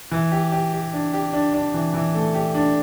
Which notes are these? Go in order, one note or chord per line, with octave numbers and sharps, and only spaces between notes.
E3
G4
G4
G4
D4
G4
D4
D4
E3
E3
A3
G4
D4